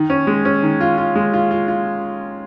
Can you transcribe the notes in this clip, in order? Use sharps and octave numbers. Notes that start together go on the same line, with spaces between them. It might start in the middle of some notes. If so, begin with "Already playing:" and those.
Already playing: D#3
C#4
G#3
C#4
D#3
F4
F4
G#3
F4
F4
F4